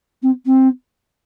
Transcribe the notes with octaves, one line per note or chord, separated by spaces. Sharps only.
C4
C4